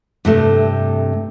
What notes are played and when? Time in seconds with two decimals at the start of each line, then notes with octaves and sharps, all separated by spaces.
0.25 G2 C3 A3